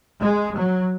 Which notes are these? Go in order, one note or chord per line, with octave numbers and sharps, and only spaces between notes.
G#3
F#3